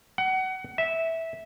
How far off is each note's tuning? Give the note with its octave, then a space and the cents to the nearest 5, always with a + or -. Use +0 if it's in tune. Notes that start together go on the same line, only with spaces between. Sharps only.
F#5 +25
E5 -10